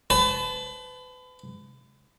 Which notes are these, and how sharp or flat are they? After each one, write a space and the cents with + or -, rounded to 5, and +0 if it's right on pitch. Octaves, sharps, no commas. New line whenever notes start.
B4 +35 A5 -20